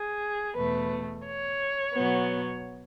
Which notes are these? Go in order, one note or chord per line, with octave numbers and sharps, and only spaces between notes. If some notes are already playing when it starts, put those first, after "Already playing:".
Already playing: G#4
E2 B2 A3 B4
C#5
B2 F#3 B3